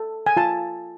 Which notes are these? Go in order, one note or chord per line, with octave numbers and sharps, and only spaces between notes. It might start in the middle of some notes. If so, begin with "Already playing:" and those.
Already playing: A4
G#5
F4 A5